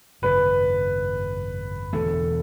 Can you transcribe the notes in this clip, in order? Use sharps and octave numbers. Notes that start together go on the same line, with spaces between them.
G#1 F#2 C#3 B4
E1 E2 D3 A3 A4